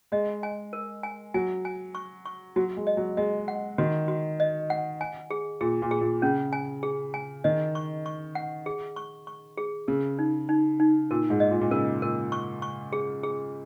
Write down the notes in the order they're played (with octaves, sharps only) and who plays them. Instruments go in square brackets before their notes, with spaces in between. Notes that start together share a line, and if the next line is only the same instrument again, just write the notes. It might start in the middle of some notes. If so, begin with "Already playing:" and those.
[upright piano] G#3 [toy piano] D#5
[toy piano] G#5
A#4
G#5
[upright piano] F#3 [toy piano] G#5
[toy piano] G#5
C#6
C#6
[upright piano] F#3 [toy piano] F#4
[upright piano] G#3
[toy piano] D#5
[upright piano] F#3
[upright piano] G#3 [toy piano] D#5
[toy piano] F#5
[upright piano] D#3 [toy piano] F#4
[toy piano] F#4
D#5
F#5
G#5
G#4
[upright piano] A#2 [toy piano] G#4
[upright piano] A#2
[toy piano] G#4
[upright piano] A#2
[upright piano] C#3 [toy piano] C#4
[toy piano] G#5
G#4
G#5
[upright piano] D#3 [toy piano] D#5
[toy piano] C#6
C#6
F#5
G#4
C#6
C#6
G#4
[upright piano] C#3 [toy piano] A#4
[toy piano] D#4
D#4
D#4
[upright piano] A#2 [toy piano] A#4
[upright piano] G#2
[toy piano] D#5
[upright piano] A#2
A#2
[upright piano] C#3 [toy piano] A#4
[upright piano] A#2 [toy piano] A#4
[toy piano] C#6
C#6
G#4
G#4